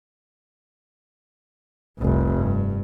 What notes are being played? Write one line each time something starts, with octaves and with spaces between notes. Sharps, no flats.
F1 C2
G2